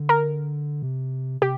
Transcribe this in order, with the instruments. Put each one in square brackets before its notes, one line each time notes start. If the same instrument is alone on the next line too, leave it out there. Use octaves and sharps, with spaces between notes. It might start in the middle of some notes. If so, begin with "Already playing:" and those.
Already playing: [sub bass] D3
[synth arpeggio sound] A#4
[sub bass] C3
[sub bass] C3 [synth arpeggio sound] G4